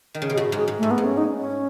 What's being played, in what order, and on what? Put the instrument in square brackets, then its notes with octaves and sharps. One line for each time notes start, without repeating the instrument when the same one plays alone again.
[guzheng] D#3
C#3
[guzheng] B2 [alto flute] G#4
[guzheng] A2 [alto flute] F#4
[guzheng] G#2 [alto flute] G#4
[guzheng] G#2
[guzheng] G#2 [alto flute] A3
[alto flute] B3
[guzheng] G#2
[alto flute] C#4
D#4
C#4